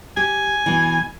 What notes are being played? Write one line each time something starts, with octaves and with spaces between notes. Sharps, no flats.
G4 G#5
B2 E3